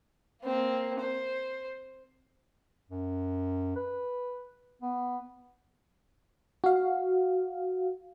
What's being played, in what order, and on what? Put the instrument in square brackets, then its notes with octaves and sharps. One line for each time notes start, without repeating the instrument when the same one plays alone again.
[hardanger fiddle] A#3 C4
C5
[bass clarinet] F#2
B4
B3
[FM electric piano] F#4 F5